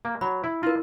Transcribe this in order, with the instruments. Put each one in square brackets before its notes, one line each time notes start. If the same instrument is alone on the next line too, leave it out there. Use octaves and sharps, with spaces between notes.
[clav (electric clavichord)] A#3
[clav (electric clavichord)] F#3 [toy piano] B5
[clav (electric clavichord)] E4
[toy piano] E4 A#4 [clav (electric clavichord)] F4